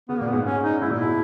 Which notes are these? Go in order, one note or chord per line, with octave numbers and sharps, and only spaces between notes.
C#3 B3
A#2 A#3
B3
G#2
C#4
D#4
G#2 E4
A#2
B2 E4